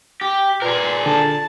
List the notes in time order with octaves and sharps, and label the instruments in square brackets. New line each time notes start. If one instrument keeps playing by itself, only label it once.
[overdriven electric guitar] G4
[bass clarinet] A#2 [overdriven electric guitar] G#4 A#4 [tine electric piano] B4
[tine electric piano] D3 [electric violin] A5